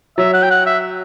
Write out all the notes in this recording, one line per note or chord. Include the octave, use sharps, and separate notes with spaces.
F#3 E5
F#5
G5
F#5
E5